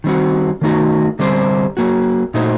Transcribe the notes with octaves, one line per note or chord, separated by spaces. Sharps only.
D#3 G3 C4 F#4
D#3 A3 D#4 F#4
D3 G3 C4 G4 C5
F#3 A#3 F#4
A#2 A3 D#4 F#4 C5